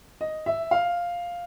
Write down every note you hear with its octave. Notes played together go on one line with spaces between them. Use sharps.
D#5
E5
F5